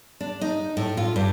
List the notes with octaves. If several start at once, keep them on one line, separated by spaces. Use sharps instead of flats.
D4
D#4
A2
F4
G2